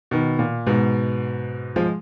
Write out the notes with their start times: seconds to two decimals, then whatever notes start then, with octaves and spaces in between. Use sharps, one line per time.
0.11 B2 D#3
0.39 A#2
0.67 G#2 B2
1.76 F3 G#3